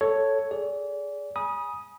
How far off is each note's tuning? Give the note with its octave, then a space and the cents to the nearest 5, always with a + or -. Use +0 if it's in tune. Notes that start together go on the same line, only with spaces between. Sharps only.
A4 +0 C#5 +0
G#4 +0 D5 -30
G#5 +5 B5 -35 D#6 +5